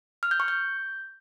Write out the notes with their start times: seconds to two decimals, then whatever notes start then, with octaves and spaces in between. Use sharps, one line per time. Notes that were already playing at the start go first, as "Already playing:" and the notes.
0.23 F6
0.31 G6
0.40 C#6
0.48 G6